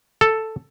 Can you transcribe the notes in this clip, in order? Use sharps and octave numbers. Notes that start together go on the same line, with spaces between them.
A4